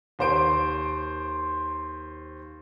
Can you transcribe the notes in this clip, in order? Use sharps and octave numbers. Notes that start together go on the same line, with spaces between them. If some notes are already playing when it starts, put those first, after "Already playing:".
D#2 C5 D7